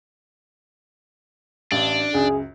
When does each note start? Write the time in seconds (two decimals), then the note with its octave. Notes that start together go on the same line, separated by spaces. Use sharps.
1.72 A1 D4 F5
2.14 C#2 F#2 G#4